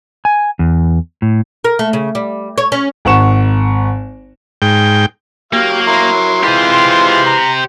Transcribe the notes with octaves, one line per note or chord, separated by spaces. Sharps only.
G#5
E2
A2
A#4
A3
C#3
G3
C#5
C#4
G#1 F#5 C#6 E7
G#2 G5
F#3 A#3 G4 F5
F#3 E4 A#4 C6
E3 G#3 F4 G4 C5
A#5